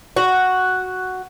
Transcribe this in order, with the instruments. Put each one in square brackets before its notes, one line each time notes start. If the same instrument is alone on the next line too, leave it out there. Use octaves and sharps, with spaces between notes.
[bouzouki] F#4